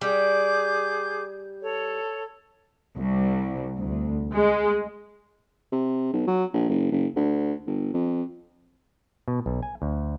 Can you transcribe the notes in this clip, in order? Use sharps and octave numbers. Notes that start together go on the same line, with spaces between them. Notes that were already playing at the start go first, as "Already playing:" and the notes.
G3 G#4 D6 G6
A4 C#5
C2
D2
G#3
C3
B1
F#3
A#1
F#1
F#1
D2
G1
F2
B2
B1
G#5
D2